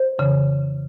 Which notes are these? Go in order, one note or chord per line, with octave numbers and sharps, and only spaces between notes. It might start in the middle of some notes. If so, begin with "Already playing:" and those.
Already playing: C5
F2 C#3 E3